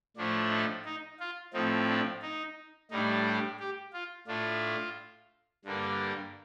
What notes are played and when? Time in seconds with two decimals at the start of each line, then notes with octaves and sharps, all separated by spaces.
0.17 A2 F3 A3 D4
0.51 D#4
0.86 D#4
1.20 F4
1.53 A2 F3 C4 D#4
1.89 D4
2.22 D#4
2.91 A2 G3 D4 D#4
3.25 G4
3.59 G4
3.93 F4
4.27 A2 A3 D4 F4
5.64 G2 D3 G3 A#3 D4